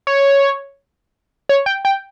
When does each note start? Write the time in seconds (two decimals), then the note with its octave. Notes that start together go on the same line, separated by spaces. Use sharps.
0.07 C#5
1.49 C#5
1.66 G5
1.85 G5